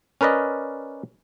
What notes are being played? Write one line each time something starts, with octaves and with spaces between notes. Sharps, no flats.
C#4 A#4 B4 D5 D#5